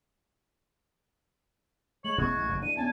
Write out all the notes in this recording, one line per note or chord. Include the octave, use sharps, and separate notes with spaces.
G#3 A3 C#5 F#7
E1 B2 C#4 E4 F#4 G#6
A1
F#1 F#2 C#3
E3 D4 D#7
B3 C#4 D4 G#5 A5